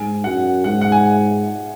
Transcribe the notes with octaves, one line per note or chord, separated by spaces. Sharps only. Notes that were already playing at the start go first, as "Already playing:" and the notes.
Already playing: G#2 G#5
F#2 F#5
G#2 F#5
F#5
G#5